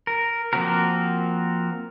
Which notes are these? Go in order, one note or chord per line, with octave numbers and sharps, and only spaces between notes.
A#4
F3 A#3 C4 F#4 A#4